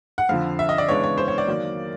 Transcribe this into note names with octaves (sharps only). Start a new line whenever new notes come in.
F#5
F2 D3 F3 F5
E5
D#5
D5
C#3 E3 G#3 B3 D4 C#5
C#5
C5
C#5
D5
D#3 F#3 A#3